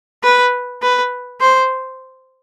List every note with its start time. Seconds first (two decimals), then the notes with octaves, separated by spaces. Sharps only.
0.23 B4
0.82 B4
1.40 C5